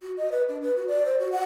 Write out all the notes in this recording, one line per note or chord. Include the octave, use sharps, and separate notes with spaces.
F#4
D#5
B4
D4
B4
F#4
D5
C5
F#4
F#5